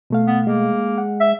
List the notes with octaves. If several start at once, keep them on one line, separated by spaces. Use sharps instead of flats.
B2 A3 F5
B3
G#3 A#3
F#5
E5